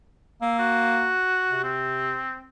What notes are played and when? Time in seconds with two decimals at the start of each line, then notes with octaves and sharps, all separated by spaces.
0.42 A#3 E6
0.59 F#4
1.50 C3
1.64 C4